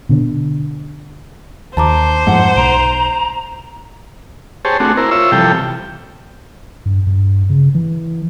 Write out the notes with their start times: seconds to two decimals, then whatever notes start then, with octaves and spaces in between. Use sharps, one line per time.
0.09 B2 D3
1.77 D#2 C5 A5 A#5 D6
2.27 F2 G#2 F#5
2.57 B1 A#5 D7
4.65 G4 G#4 C5 C#5 A5
4.80 A3 C4 D4 F#4 G#4
4.97 E4 A#4 C5
5.11 F4 C5 C#5 E5 E6
5.32 C3 E3 F3 G3 A4 G5
6.86 G2
7.07 G2
7.50 C#3
7.75 E3